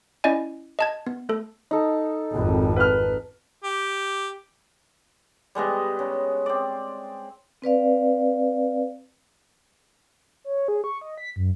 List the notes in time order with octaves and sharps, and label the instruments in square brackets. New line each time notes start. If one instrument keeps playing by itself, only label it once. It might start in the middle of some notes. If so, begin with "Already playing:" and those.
[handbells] C#4 E4 D5 D#5 G#5
D#5 A5 G#6
B3
A3 A4
[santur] D#4 A4
[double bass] G#1 F2
[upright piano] B4 F6
[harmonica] G4
[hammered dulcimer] G3 G#3 B3 D#5
C#3
C4 D5
[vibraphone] C4 B4 D5 F5
[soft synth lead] C#5
G#4
C#6
D#5
B6
F#2